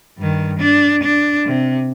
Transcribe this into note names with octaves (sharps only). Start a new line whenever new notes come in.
G2 D#3
D4
D4
C3